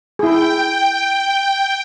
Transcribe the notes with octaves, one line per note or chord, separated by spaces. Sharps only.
E4 G#4 G5